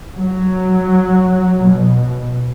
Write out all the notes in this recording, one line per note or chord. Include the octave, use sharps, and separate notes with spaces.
F#3
B2